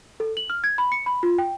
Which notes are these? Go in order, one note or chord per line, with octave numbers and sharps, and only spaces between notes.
A4
F#7
F6
G#6
B5
C#7
B5
F4
G5